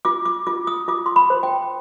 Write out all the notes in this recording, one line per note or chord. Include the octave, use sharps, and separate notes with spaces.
F4 D6
D6
F4 D6
D#6
F4 D6
C6
B5
C5
G5